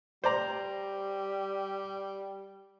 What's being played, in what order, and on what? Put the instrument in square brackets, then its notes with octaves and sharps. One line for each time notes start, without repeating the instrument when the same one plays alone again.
[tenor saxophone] G3 [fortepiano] C5 D5 A#5